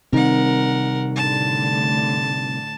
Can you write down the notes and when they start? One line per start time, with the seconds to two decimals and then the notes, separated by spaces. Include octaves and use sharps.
0.13 C3 D#3 G3 C4 D#4 A#4 F#5
1.16 A2 D3 A5